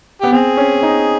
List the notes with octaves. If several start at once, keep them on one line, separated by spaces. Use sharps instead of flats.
B3 G4
C4 G#4
C#4
D#4